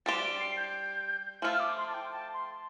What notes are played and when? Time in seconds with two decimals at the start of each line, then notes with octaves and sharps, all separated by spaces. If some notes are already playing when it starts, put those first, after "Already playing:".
0.06 G3 D4 G4 C5 A6
0.23 D7
0.40 C7
0.57 G6
1.42 F3 A3 F4 F6
1.53 F6
1.60 D6
1.78 C6
1.86 A5
1.94 G5
2.12 A5
2.34 C6